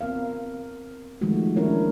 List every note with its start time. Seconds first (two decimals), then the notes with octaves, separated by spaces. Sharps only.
0.01 B3 C4 A#4 F5
1.21 D#3 F3 G#3 A3 F#4
1.56 A#3 C#4 D4 E4 A#4 C#5